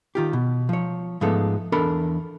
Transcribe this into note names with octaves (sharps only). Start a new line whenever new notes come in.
D#3 F4 G4
B2
F3 C#5
G#2 F3 G#3 A3 B3 A4
E2 D4 A4 A#4 B5